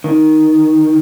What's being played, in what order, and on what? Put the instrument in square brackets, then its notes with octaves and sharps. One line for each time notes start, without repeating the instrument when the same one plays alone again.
[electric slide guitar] D#3